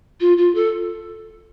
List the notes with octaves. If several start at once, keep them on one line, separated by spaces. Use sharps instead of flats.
F4
F4
A4